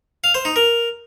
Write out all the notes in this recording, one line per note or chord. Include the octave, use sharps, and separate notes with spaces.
F5
C5
D#4
A#4